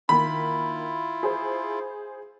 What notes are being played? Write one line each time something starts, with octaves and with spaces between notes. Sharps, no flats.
D#3 A#3 E4 F4 B5
G#4 C5